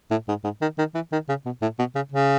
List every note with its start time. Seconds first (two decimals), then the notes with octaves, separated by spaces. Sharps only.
0.11 A2
0.28 G#2
0.44 G#2
0.62 D#3
0.78 D#3
0.95 E3
1.12 D#3
1.29 C#3
1.46 B2
1.62 A2
1.79 B2
1.95 C#3
2.12 C#3